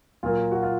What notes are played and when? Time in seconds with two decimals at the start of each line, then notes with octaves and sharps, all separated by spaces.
0.23 A#2 F#3 A#3 F4
0.52 F#4
0.63 F4